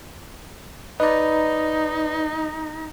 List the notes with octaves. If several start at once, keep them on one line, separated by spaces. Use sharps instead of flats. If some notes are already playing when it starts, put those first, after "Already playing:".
D#4 B4 D5 D#5